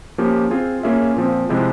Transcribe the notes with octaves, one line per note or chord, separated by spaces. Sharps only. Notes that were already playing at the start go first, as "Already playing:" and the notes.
F3 A#3 C#4 G4
C4 F4 G#4
A#3 C#4 F4 G#4 E5
A#2 F3 C4
C3 F3 G#3 E4 G4